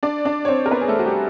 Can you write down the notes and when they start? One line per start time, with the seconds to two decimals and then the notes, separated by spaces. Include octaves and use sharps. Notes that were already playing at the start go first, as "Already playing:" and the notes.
0.03 D4 D5
0.25 D4 D5
0.45 C#5
0.48 C4 C5
0.66 A#4
0.71 B3 B4
0.81 G#4
0.88 A3 A4
0.99 F#4
1.05 G3 G4